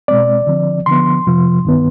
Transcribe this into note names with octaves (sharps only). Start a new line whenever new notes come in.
B2 G#3 C4 D5
D3 F3 C4
D3 F3 B3 C6
F2 C3 F3
G2 D#3 B3